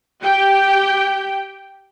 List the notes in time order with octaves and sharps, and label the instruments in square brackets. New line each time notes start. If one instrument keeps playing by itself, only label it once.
[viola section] G4 G5